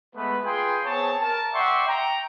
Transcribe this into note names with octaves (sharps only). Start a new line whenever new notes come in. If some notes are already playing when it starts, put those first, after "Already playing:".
G#3 A3 B3 B4
F4 G#4 B4 G5 C6
B3 C4 G#4 C#5 A5
A#4 A5
D5 E5 F#5 G5 C6 C#6
G5 A#5